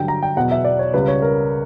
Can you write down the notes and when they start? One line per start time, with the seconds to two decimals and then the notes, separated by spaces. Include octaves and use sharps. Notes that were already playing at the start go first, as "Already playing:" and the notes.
Already playing: G2 D3 F#3 G5
0.08 A#5
0.23 G5
0.37 E2 B2 F#3 F#5
0.51 E5
0.64 D5
0.79 C#5
0.94 C#2 C#3 G3 B4
1.08 C#5
1.22 A#4